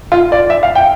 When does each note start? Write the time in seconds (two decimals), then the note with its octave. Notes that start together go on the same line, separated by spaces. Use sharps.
0.12 F4
0.32 D5
0.50 E5
0.63 F5
0.75 G5